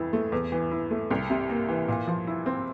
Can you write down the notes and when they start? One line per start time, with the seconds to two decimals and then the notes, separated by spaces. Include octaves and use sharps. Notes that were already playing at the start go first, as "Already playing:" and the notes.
Already playing: F2 E3 E4
0.13 A3
0.32 E2
0.52 E3
0.71 E4
0.91 A3
1.11 C2
1.30 C3
1.49 A#3
1.69 E3
1.88 A#2
2.07 F3
2.27 E4
2.46 C4